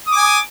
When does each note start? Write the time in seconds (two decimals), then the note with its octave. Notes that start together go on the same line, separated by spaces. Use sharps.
0.07 D#6
0.12 D6
0.17 G#5